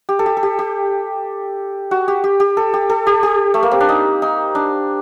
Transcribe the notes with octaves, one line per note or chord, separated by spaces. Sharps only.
G4
A4
G4
A4
G4
G4
F#4
G4
G4
G4
A4
G4
A4
G4
G4
A3
A#3
C4
D4
D#4
D#4
D4